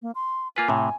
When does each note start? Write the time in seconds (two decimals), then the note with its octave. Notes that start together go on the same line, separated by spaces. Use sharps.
0.02 A#3
0.15 C6
0.56 A#3 F4 B4 G#5
0.68 A2 C3